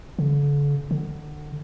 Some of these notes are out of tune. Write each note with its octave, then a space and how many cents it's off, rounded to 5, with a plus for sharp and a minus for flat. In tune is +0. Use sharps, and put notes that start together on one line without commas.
D3 -40
D3 +25